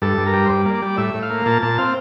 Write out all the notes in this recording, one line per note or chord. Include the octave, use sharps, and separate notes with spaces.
G2 A4
G2
A#4
G3
C5
G2 D5
A#3
D5
G3
A2 E5
A2
F5
A#3
A#2 A5
A#2 A5
C4 F5